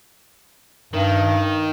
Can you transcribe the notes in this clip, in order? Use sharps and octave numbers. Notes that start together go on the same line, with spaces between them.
G2 D#3